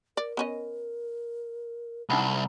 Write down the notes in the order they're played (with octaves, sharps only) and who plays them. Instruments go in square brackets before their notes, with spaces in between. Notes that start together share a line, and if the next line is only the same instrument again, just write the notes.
[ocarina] A#4 [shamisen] D5
[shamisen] B3 C#4 D#5
[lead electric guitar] C2 [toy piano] D#4 F#5 B5